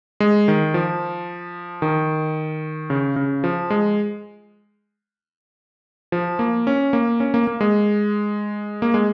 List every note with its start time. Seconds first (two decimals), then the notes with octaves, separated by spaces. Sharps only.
0.20 G#3
0.48 D#3
0.74 F3
1.82 D#3
2.90 C#3
3.16 C#3
3.44 F3
3.70 G#3
6.12 F3
6.39 A#3
6.67 C#4
6.93 A#3
7.20 C#4
7.34 A#3
7.47 A#3
7.61 G#3
8.82 A#3
8.94 G#3